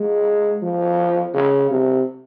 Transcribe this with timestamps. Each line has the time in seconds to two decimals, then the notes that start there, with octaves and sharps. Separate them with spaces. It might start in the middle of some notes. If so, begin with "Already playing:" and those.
Already playing: G#3
0.63 F3
1.34 C#3
1.70 C3